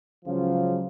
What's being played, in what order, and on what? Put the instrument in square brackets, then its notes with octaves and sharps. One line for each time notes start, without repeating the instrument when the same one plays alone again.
[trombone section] C#2 C#3 F3 F#3 F4